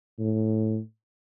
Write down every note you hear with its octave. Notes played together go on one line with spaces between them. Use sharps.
A2